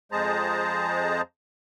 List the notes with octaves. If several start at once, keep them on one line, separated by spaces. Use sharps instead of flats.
F2 G#3 G#4 C5 A5 A#5